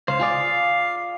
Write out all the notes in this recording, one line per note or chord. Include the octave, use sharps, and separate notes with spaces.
C#2 C5 F5
F4 G#4 D5